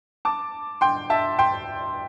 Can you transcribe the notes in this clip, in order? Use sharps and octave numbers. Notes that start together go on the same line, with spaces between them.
A5 D6
G5 C6
E5 A5
G5 C6